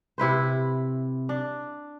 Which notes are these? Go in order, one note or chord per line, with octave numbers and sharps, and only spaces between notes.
C3 E4 B4 C5
D4